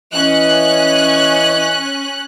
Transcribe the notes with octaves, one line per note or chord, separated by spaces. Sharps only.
E3 C#4 D#5 F#6